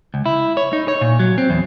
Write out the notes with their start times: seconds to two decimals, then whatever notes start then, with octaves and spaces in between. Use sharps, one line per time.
0.14 C#2
0.26 E4
0.57 C#5
0.73 D#4
0.88 C#5
1.01 A#2
1.19 F#3
1.38 C4
1.50 E2